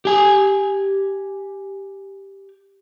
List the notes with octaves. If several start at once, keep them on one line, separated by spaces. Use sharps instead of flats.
G4 G#5